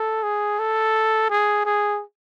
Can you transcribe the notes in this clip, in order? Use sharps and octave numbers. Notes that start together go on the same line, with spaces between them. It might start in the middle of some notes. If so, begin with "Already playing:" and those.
Already playing: A4
G#4
A4
G#4
G#4